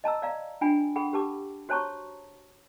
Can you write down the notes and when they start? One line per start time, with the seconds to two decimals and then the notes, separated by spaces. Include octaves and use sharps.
0.04 D#5 A5 A#5 E6
0.22 D5 F5 A#5
0.61 D4 F4 G5 G#5 B5
0.96 G#4 A4 F#5 G5 B5
1.13 G4 B4 A5 D6
1.69 F#4 C5 C#5 A5 A#5 C#6